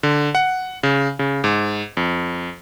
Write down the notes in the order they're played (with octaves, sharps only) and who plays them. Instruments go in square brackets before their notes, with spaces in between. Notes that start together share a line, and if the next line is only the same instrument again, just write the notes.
[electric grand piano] D3
F#5
C#3
C#3
G#2
F2